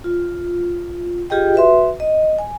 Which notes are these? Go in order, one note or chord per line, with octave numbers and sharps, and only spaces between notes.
F4
F4 G4 G#4 D#5 G5
F#4 B4 E5 C6
D#5
G#5